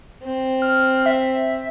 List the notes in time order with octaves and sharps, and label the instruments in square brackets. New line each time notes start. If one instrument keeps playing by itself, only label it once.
[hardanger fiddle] C4
[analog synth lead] F6
E5